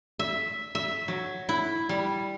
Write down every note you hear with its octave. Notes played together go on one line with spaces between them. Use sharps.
E5
E5
F#3
E4
G3